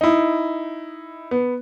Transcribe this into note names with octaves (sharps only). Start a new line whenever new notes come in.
D#4 E4
B3